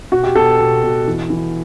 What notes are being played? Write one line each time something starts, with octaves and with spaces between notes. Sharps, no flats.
B2 F#4
G4
B2 A4
B2
B2
E3
E3